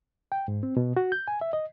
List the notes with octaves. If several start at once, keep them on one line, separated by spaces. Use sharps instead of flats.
G5
G#2
C4
B2
F#4
G6
G#5
E5
D#5